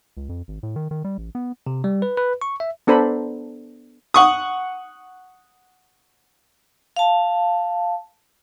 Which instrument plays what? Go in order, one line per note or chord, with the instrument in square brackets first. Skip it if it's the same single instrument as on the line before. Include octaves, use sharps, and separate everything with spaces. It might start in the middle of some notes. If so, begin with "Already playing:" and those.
[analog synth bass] C#2
F2
G#1
A2
D#3
D#3
G3
A1
B3
[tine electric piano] C3
G3
B4
B4
C#6
E5
[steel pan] B3 D4 A4 C5 A#5 B5
[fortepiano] F#5 C#6 D#6
[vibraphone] F5 A5